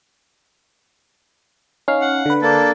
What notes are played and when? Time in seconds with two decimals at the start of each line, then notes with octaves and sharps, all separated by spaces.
1.88 C#4 D#4 F5
2.01 F#5
2.26 D3 B4
2.42 A#3 D4 A4